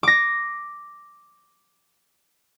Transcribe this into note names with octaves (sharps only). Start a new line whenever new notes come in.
D6 A#6